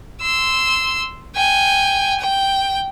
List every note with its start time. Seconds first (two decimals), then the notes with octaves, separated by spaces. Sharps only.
0.22 C6 E6
1.35 G5 G#5
2.20 G5